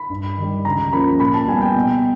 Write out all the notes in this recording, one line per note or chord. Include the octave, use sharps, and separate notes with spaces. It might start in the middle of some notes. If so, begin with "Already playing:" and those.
Already playing: B5
G2
D#3 G3
C#2 A#5
C#3 F3 A#3 B5
A#2 B5
A5
G3 B3 G#5
G5
B2